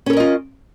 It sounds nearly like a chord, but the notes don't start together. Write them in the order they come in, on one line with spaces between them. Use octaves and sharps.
C#4 A4 A#4 D#5 F4